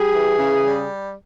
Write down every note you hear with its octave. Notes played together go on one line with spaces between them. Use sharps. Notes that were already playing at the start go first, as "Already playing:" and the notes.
Already playing: G3 G#4
E3
C#3
G3